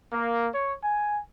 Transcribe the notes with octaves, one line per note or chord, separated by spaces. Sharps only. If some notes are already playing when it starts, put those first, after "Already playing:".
A#3
C#5
G#5